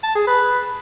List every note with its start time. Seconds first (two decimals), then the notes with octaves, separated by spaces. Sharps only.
0.03 A5
0.15 G#4
0.27 B4